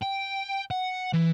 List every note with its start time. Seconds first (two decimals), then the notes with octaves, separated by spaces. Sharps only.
0.02 G5
0.71 F#5
1.13 E3